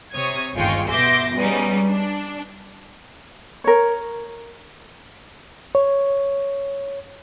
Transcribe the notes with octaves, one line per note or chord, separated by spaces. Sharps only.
C3 C#5 D#6 G#6
G1 D#2 G#3 F4 G5 C#6
B2 E5 C6 D6 G6 A#6
G3 G#3 B3 C#4 D#4
D4
A#4 C#5
C#5